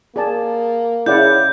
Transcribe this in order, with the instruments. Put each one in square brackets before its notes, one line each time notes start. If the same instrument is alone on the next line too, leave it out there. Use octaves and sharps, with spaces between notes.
[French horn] A#3 [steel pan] G#4 D5 A5
[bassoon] C#3 [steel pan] E4 D5 F#5 [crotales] G6